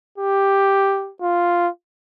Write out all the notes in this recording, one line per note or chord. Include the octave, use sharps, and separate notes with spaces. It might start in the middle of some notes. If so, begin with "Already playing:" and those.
G4
F4